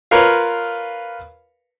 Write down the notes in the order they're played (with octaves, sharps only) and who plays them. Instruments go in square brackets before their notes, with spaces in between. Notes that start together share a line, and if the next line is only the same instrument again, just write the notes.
[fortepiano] F4 A#4 B4 C#5 F5